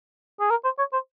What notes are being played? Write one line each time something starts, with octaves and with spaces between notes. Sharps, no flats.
G#4
A#4
C5
C#5
C5